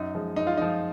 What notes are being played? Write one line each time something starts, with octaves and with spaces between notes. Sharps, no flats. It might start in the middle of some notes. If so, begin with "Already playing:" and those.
Already playing: F#2 D#4
F3 G#3
F#2 D#4
F4
F3 G#3 D#4